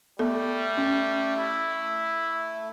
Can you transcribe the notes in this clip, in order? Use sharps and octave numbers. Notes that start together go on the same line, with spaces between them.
G3 A3 B3 A4
C#4
E4